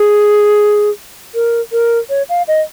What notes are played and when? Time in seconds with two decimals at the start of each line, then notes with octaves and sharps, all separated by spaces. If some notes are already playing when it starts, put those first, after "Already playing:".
Already playing: G#4
1.35 A#4
1.72 A#4
2.10 C#5
2.29 F5
2.48 D#5